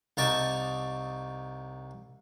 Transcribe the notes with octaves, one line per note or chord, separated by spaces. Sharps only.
C2 D#4 A5 C#6 D6